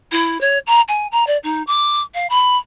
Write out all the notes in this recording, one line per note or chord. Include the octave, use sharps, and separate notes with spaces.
E4
C#5
A#5
G#5
A#5
D5
D#4
D6
F5
B5